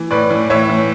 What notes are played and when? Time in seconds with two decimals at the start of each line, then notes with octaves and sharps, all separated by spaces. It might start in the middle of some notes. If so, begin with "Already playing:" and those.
Already playing: E3
0.11 A2 B4 D5
0.30 E3
0.50 A2 C#5 E5
0.69 E3